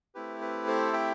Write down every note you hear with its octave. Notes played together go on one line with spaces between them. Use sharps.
A3 C4 E4 G4 B4
B4
A4 C5
E5 G5